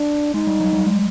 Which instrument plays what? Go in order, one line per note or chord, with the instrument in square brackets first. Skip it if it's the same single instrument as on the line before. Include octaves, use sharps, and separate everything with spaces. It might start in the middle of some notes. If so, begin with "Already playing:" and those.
Already playing: [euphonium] D4
[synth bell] G#3 [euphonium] D#4
[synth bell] G3
F#3
G3
G#3